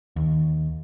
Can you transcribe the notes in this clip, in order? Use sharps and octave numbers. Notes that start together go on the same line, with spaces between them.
D#2